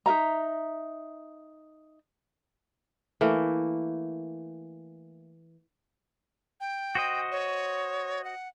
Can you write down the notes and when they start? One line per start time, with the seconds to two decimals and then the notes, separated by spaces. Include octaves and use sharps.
0.06 D#4 A#4 E5 A#5
3.21 E3 A3 A#3
6.60 G5
6.95 F#4 C5 D#5
7.32 C#5
8.24 F#5